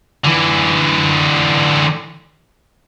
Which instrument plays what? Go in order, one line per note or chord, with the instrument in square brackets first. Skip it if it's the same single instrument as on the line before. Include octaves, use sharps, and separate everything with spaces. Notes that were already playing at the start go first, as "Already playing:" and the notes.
[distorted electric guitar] D3 E3